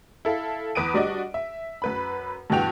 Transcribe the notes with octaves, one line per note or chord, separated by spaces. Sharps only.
E4 A4 F5
E2 B4 D#6 D7 D#7
G3 D4 F#4 D5 D#5
E5
F#2 B4 B5
G2 B2 E3 F#4 G5 F7